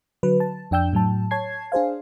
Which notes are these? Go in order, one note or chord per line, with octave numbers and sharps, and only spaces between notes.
D3 F#3 B4
A5
F2 D4 G5 E6 G6
A2 F#3 A5
C#5 A5 G#6 C7
D4 G#4 C5 F5